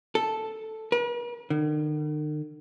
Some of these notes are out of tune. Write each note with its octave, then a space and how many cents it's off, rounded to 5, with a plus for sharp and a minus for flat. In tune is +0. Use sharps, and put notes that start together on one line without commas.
A4 +0
B4 -45
D#3 -45